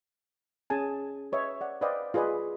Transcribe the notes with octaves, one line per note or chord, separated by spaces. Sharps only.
C#4 G#4 G#5 A5
B4 C#5 D#5 E5
D5 F#5
B4 C5 D5 D#5 F5 G5
F4 G#4 B4 D5 D#5